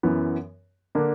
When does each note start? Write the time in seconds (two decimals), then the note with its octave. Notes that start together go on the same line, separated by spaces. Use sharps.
0.03 F#2 E3 B3
0.95 D3 A#3 D4